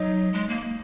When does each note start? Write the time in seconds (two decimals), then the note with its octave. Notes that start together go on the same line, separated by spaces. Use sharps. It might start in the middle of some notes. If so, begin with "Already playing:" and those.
Already playing: F#3 D#4
0.33 G#3
0.49 A#3